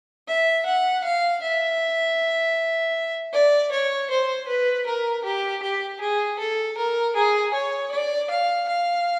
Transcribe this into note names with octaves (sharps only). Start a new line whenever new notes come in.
E5
F#5
F5
E5
D5
C#5
C5
B4
A#4
G4
G4
G#4
A4
A#4
G#4
C#5
D5
F5
F5